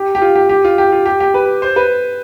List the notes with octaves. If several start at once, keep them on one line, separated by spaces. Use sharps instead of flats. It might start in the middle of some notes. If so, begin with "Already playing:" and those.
Already playing: G4
G4
F4
G4
G4
F4
G4
F4
G4
G4
B4
C5
B4